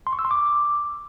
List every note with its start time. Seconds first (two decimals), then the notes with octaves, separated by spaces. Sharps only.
0.07 C6
0.13 C#6
0.19 E6
0.25 C6
0.31 D6